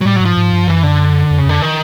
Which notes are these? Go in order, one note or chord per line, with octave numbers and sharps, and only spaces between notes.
F#3
A2 G3
F#3
G#2
F3
G#2
G2
F#2 E3
D3
F2
C#3
F2 D3
D#3